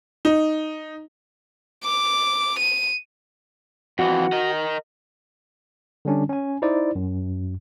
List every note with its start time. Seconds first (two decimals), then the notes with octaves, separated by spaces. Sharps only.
0.25 D#4
1.84 D6
2.60 D#7
3.99 F2 E3 F#4
4.32 A#4 D#5
6.05 D3 G3 C#4 D4
6.29 C#4 G#5
6.62 D#4 E4 C5 D5
6.95 F#2